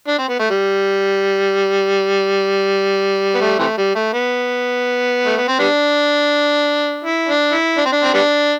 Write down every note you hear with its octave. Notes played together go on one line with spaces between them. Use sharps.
D4
C4
B3
A3
G3
B3
A3
C3 E3 A3
G3
A3
B3
A3
B3
C4
G3 B3 D4
E4
D4
E4
D4
C4
D4
C4
G3 B3 D4